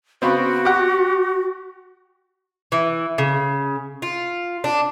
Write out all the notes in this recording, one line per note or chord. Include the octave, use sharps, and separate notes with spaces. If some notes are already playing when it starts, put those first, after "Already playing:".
C#3 B3 C4 F#4
G4 F#5
E3
C#3
F4
D4